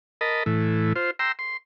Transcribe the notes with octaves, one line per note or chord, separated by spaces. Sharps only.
A#4 D#5 A5 B5
A2 E3
F4 C5
G5 A#5 C6 E6
C6